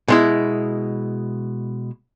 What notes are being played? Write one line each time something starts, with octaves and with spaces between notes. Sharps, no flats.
B2 G#3 E4